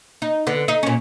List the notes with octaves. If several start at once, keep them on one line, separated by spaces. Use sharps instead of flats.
D#4
D3 B3
D#4
A#2 C#4